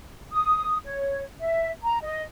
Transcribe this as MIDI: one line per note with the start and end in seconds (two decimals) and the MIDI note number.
0.32 0.77 87
0.85 1.23 73
1.40 1.70 76
1.83 1.98 82
2.03 2.23 75